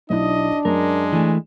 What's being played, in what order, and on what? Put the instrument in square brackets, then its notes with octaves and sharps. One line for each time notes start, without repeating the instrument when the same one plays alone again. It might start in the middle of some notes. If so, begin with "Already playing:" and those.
[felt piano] B1 E4 D#6 [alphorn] D4 [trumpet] D#5
[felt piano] F#2 [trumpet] G#3 [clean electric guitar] A#4
[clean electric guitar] E3 A3